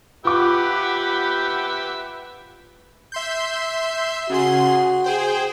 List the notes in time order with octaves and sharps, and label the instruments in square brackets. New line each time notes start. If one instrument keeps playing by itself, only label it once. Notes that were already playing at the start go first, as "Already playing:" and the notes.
[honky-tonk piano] F4 D6 [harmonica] G4 E5 [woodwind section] B4 F#5
[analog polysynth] E5 C6 G6
[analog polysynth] C#3 G#4 C6 [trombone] F#4
[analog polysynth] G#4 C5 G5